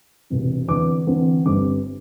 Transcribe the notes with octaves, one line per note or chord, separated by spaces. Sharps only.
E1 E2 C3
E2 D3 C4 D6
E2 D3 C4
G1 G2 G3 C4 D6